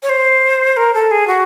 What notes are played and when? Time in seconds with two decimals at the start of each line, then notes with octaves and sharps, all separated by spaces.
0.03 C#5
0.09 C5
0.77 A#4
0.94 A4
1.11 G#4
1.28 F#4